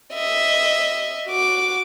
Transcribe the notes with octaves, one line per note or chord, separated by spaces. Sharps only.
D#5 E5
F#4 D6